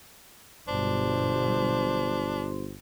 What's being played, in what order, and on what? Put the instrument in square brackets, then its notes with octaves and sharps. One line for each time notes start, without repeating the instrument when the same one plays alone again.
[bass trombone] G1 [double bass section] G2 B2 F#3 [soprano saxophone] D4 [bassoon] C5